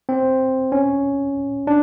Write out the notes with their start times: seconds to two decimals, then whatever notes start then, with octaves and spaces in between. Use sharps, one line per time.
0.09 C4
0.72 C#4
1.67 D4